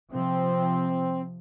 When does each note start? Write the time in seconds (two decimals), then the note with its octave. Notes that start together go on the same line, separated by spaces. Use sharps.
0.12 C3 F3 C4